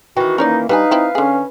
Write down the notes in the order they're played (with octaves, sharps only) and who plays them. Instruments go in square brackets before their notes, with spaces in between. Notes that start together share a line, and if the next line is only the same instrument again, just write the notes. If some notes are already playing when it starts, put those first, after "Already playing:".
[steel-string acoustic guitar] D#3 E3 [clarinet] F#4 [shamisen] G5
[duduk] A#3 [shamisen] C#4 C#5 D5 [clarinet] D#4
[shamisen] G3 D4 G#5 [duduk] D#4 [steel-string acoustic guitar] B4 [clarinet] F5
[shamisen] C4 E4
[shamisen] D3 G#4 [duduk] C#4